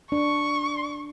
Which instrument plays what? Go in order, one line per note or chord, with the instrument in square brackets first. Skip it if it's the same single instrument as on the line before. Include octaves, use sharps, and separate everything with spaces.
[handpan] D4 [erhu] C#6